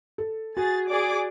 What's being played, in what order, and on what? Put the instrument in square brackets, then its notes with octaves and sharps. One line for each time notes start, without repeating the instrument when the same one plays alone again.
[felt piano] A4
[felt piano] F#4 [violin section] G#4 A6
[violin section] G#4 D5 D6